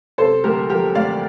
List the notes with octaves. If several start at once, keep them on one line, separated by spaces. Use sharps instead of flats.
C3 A4 C5
D2 G4 A#4
F3 G4 A#4
D2 D5 F5